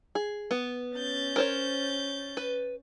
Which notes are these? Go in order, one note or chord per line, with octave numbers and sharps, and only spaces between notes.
G#4
B3
C#4 G6 A6
A#4 C5 C#5
B4